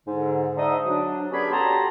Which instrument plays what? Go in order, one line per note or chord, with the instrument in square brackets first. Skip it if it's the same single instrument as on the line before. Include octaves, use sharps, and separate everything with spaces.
[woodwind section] G#2 D3
G#2 D4 D#4 D#5 E5 D#6
F#3 D4
D3 B3 C#4 G4 G#4 B5
F#4 G4 A4 A5 A#5 C6